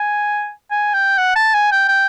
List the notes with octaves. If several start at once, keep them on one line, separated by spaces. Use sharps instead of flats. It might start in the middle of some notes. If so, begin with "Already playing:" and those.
Already playing: G#5
G#5
G5
F#5
A5
G#5
G5
G5